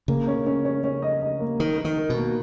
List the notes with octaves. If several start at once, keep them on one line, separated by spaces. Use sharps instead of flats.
C#3 A#3
C#4
C#4
C#4
C#4
D#5
D#5
A#3
D#3 A#4
A#4
D#3
A#4
B2
A#3